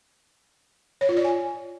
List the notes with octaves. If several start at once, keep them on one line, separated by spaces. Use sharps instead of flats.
C#5
F4
D5
G#5